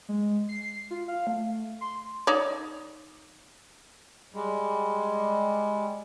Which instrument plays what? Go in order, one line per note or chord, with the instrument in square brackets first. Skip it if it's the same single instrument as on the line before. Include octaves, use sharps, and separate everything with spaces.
[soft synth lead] G#3
C7
C7
F4
F5
A3
C6
[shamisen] D#4 C#5 D5
[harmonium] G3 G#3